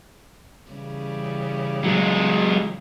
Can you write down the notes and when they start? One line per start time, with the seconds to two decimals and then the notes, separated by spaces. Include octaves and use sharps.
0.71 C#3 E3 G3
1.84 F#3 G#3